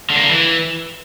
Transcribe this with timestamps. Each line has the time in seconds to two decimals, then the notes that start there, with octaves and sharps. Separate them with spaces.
0.10 D3
0.17 A#3
0.23 D3
0.30 E3